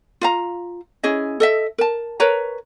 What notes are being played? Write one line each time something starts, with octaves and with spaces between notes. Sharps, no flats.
F4 F5 A#5
C#4 E4 G#4 D#5
A4 D#5 E5
A#4 A5
A#4 B4 C#5 A#5